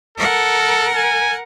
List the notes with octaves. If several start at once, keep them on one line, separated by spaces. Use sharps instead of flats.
A4 A#4 F#5
G#5